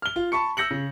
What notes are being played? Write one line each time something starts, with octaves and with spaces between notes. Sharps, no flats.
F6 G7
F4
A5 B5 C#6 C#7
E6 G6 A#6 C#7 F#7
C#3